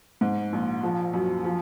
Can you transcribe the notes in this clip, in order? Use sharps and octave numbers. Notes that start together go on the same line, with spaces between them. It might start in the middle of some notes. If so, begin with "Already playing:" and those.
G#2
A#1
F3
F#2
F3